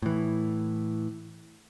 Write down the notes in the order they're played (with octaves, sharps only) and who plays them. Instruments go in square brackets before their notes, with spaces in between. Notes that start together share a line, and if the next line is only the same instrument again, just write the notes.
[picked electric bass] A2 E3